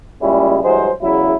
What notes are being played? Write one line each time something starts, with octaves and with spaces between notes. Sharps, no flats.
A#2 C#3 G3 G#3 C#4 E4
G2 E3 F#3 G#3 C5
E2 C#3 F#3 E4